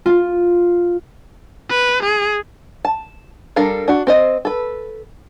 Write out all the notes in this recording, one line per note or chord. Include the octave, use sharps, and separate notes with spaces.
F4
B4
G#4
A5
G3 D4 A4 A#4 F5
D4 F#4
C4 C5 D#5
A4 B4